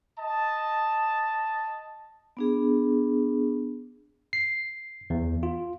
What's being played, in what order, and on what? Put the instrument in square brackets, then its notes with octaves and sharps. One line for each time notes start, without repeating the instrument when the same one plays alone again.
[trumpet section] D#5 A5
[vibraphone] B3 D4 G#4
[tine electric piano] C7
E2
F4